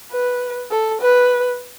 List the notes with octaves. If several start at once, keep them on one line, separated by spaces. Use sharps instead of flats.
B4
A4
B4